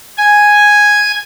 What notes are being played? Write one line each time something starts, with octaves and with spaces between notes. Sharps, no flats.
G#5